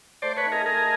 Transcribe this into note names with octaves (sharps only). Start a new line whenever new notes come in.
A3 C5 D5
B4 C#5
C4 D#4
G#4 A#4
A3 G#4 A#4